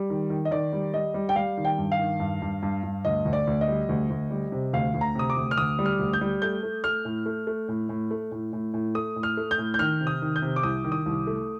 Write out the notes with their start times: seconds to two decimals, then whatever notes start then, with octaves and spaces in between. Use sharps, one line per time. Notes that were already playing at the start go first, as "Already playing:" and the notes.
Already playing: G3
0.10 D#3
0.30 D#3
0.45 D#5
0.51 D#3 D5
0.73 G3
0.94 G3 D#5
1.14 G3
1.29 G5
1.36 G3 F5
1.57 D#3
1.65 G5
1.78 G2
1.92 F5
1.99 D#3
2.20 G2
2.42 G2
2.63 G2
2.83 G2
3.05 D2 D#5
3.25 D2
3.33 D5
3.47 D2
3.61 D#5
3.68 G3
3.89 D2
4.10 D2
4.31 G3
4.52 C3
4.73 D2 F5
4.94 D2
5.01 A#5
5.15 C3 D#6
5.30 D6
5.37 D2
5.51 F6
5.57 D2 D#6
5.79 G3
5.86 F6
5.99 D2
6.13 G6
6.21 G3
6.42 A3 G6
6.63 A3
6.84 A3 F6
7.05 A2
7.26 A3
7.47 A3
7.68 A2
7.89 A2
8.11 A3
8.31 A2
8.53 A2
8.74 A2
8.95 A3 D#6
9.16 A2
9.23 F6
9.37 A3
9.51 G6
9.58 A2
9.74 G6
9.79 D#3 F6
10.01 C3
10.07 D#6
10.22 D#3
10.36 G6
10.42 C3
10.56 D6
10.63 C2 D#6
10.84 D#3
10.92 D#6
11.06 C2
11.27 A3